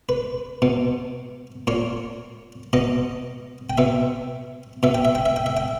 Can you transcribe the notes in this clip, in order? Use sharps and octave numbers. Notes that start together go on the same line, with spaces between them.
B4
B2
A#2 C#5
B2 D#5
G5
B2 E5
B2 E5
G5
E5
G5
E5
G5
E5
G5